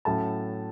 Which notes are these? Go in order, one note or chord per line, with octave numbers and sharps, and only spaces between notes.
A2 F#3 A3 C#4 A5